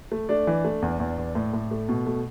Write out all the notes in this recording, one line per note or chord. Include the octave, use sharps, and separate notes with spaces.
A3
A3 D4 D5
E3
A3
E2
E2
E2
A2
A2
A3
B2
A3